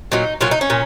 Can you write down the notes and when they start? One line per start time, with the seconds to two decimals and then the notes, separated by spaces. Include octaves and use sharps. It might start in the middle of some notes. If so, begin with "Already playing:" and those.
0.12 A#2 F#3 D#4
0.41 A#2 F#3 F4
0.51 D#4
0.61 C#4
0.70 A#2